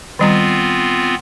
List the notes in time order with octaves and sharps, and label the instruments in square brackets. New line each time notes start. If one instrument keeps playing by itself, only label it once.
[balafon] D#3 G3 A#5 [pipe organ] B3 C4 F4